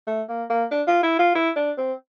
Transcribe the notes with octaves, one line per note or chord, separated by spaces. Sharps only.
A3
A#3
A#3
D4
F4
E4
F4
E4
D4
C4